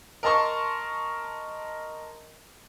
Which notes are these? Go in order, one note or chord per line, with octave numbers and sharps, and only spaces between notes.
A#4 D#5 A5 C6 C#6